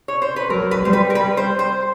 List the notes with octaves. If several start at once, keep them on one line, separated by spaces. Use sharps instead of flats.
C#5
C5
B4
F#3 A#4
B4
G3 C5
B4
A#4
B4
C5
C5